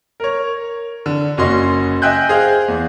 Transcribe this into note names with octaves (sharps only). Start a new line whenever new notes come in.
A#4 C#5
D3
F#1 C#4 F#4 D#5 C6
D#5 E5 G5 G#5 F#6 G6
G#4 C5 F5
E2